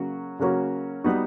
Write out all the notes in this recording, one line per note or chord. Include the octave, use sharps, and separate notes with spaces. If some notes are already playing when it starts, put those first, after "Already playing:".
Already playing: C#3 F#3 A#3 C#4 F#4
C#3 F#3 A#3 C#4 F#4
G3 B3 D#4 F#4